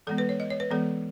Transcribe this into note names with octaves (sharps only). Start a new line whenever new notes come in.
E3 G#3 B3 A4
B4
C#5
D#5
C#5
B4
E3 G#3 B3 A4